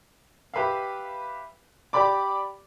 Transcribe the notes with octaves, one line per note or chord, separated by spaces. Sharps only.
G4 B4 E5 F5
G4 D5 B5 D6